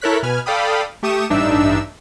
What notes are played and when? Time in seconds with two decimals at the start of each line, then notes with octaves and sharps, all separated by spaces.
0.01 E4 A4 A#4 C#5 F#6 B6
0.23 B2 B4 G#5 F6
0.46 A4 D5 F5 G5 B5 D#6
1.03 A3 G4 C#6 D#6 E7
1.30 A1 G2 D4 D#4 E5 E6